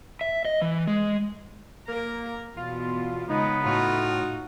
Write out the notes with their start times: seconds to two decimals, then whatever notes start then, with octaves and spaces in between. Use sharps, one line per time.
0.21 E5
0.45 D#5
0.62 E3
0.87 G#3
1.88 A#3 A#4
2.57 E2 B2 F4
3.29 C#3 G#3 B3 D#4
3.65 A2 D#4 F4 F#4